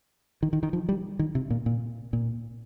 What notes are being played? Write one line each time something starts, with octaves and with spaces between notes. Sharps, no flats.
D#3
D#3
D#3
F3
G3
D#3
C3
A#2
A#2
A#2